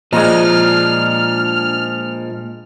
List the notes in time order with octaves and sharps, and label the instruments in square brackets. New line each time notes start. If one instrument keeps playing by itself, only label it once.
[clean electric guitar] A#2 G#3 [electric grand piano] F3 [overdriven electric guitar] D4 D#5 [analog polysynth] F6